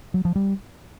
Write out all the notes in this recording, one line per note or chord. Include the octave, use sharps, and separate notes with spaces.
F#3
F3
G3